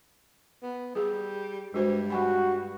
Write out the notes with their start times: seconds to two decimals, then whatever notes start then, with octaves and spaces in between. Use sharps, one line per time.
0.62 B3
0.95 G3 G4 G#4
1.74 G2 G#3 F#4 C5
2.10 G3 F#4 G#5 B5